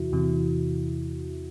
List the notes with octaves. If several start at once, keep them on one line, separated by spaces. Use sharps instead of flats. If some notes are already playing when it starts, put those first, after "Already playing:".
Already playing: E2 C3 E3 E4 F#4
E2 C3 E3